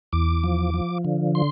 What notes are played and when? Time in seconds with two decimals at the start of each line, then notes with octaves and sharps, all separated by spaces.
0.13 E2 D6
0.44 F3
0.74 F3
1.05 D3
1.35 C6